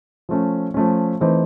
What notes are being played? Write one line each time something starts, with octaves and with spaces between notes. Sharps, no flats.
F3 A3 C#4
F3 A3 C#4
E3 A3 C4 D#4